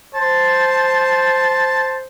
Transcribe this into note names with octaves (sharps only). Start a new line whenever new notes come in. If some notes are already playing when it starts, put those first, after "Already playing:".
C5 A5